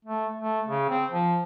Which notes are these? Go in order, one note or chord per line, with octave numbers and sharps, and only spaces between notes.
A3
A3
C#3
C4
F3